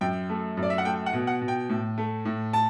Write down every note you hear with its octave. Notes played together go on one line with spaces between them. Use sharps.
F#2 G5
A3
F#2
D5
E5
F#5
A3 G5
F#5
B2
F#5
B2
G5
A2
A3
A2
A5